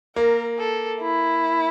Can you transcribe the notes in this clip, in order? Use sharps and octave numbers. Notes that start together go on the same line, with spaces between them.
A#3 A#4
A4
E4